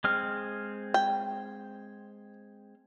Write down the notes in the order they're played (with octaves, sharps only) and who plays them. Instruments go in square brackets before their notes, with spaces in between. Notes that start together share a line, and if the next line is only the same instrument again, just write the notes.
[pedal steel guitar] G#3 C4 F6
[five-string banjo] G5